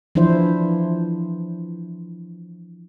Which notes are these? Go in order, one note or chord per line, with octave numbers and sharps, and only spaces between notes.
E3 F3 D4 E4 C5